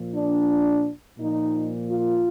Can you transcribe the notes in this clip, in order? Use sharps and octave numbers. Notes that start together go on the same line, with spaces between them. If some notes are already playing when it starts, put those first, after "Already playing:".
Already playing: A#2 F3
D4
A#2 F3 D#4
F4